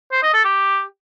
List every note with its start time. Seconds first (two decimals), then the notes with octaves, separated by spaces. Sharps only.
0.12 C5
0.23 D#5
0.34 A4
0.44 G4